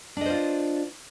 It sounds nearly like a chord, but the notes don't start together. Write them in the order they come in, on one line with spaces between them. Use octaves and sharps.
D4 D#5 C5 F4